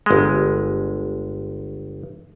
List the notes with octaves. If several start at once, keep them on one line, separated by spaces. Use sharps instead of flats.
G1 G#3